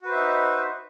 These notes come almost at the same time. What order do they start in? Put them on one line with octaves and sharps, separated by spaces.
F#4 B4 C5 E5 D#4